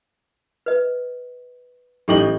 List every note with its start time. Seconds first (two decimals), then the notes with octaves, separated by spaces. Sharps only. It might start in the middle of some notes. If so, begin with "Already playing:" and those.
0.66 B4 D#5
2.08 A1 D#4 G4 A4 C#6 F#7